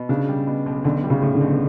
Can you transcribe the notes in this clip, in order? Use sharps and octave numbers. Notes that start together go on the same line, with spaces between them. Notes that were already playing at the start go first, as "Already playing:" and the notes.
Already playing: B2
C#3 D4
G3
B2
B1
B1 D3
G3
C#3
A2 C#3
D3
B1